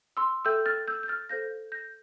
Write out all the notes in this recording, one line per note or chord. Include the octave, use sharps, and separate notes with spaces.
C6 E6
A4 E5 G5 E6 G6
F6 A6
E6 G6
G6
F6 A6
A4 C5 F5 G6 A#6
G6 A#6